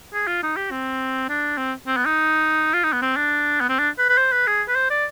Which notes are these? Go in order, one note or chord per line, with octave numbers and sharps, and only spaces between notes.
G#4
F4
D#4
G4
C4
D4
C4
C4
B3
D#4
F4
D#4
B3
C4
D4
B3
C4
D4
B4
B4
C5
B4
G#4
B4
C5
D5